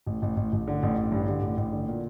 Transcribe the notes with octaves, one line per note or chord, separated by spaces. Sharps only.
A1
A1
A1
A1
D3
A1
A1
G2
D3
A1
A1
D3
A#2